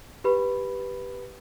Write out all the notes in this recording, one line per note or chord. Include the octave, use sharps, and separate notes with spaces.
G4 B4 B5